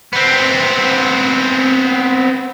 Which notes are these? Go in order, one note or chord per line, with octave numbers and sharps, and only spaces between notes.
B3 C4